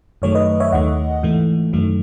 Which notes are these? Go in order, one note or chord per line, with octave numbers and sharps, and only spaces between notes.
F#2 D#3 F#3 A3 C#5
B4 D#5
C#5 E5
D#2 D#3 A3 D#5 F#5
G#2 E3 A3
F#2 D#3 F#3 A3